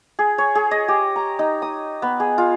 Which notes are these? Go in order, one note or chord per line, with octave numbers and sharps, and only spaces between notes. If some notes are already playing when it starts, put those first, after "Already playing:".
G#4
C#5
G#4
D#5
G4
A#5
D#4
D#6
B3
G#4
F4